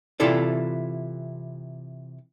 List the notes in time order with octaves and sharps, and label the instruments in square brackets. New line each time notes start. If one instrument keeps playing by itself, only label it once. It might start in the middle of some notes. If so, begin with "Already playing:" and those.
[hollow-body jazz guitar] C3 E3 E4 F4 A4 D5